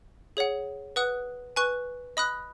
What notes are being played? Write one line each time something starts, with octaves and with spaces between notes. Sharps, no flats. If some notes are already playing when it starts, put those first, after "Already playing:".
G#4 C#5 F#5
B4 F#5 D#6 F#6
B4 G#5 C#6 F#6
D#5 B5 D#6 F#6